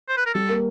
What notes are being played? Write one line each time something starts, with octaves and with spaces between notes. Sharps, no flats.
C5
B4
A#4
G3 A4
A#3